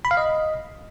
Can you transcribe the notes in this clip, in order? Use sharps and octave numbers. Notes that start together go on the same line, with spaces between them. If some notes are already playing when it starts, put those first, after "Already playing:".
B5
F5
D#5